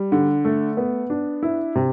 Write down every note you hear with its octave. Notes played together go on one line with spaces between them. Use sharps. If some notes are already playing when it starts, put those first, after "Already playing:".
Already playing: G3
D3
A3
B3
D4
E4
C3